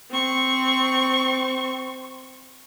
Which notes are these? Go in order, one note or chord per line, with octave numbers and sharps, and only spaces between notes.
C4 C#6